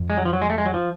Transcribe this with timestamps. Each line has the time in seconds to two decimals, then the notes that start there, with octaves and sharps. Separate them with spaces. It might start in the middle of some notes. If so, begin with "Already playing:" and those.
Already playing: F2
0.10 G#3
0.17 F#3
0.25 F3
0.33 F#3
0.42 G#3
0.50 A3
0.58 G#3
0.66 F#3
0.74 F3